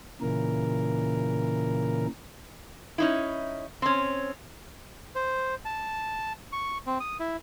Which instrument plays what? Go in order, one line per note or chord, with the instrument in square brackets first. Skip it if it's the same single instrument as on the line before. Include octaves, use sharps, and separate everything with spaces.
[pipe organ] A#2 C#3 E3 A#4
[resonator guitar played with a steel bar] C#4 D#4 E4
C4 C#4
[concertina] C5
A5
C#6
C4
D#6
E4